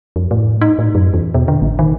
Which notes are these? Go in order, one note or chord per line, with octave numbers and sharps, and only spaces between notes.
F2
A2
D#4
A2
F#2
E2
B2
D3
A1
D#3